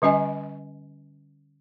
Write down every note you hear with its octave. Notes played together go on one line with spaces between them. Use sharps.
D3 G3 C#4 D#5 G#5